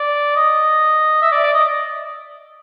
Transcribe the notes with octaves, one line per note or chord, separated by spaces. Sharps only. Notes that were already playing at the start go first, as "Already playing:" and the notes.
Already playing: D5
D#5
E5
D5
D5
D#5